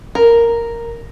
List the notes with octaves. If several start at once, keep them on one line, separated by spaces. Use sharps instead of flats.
A#4